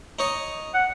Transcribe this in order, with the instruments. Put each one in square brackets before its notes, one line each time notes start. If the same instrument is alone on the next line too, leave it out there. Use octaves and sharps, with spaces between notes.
[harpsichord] D#4 C#5 D#5
[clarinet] F#5